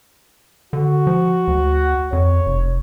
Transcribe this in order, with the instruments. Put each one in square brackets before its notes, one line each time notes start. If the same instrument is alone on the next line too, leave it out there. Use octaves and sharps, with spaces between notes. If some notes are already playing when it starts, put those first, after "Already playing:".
[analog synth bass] D3 [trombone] F#4
[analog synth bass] F3
D2
[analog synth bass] F2 [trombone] C#5
[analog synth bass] F1